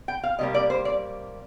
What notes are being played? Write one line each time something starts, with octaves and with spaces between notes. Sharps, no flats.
G5
F5
C3 G3 A#3 D#5
D5
C5
D5